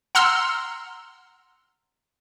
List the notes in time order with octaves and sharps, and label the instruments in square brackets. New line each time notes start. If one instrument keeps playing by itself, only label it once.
[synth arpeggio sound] F#5 A#5 C6 E6 F6